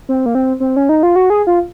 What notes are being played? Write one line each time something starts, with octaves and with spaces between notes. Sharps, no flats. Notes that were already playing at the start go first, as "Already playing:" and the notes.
C4
A#3
C4
C4
C#4
D#4
F4
F#4
G#4
F4